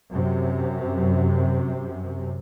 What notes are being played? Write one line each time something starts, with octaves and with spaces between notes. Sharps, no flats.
F#2 C3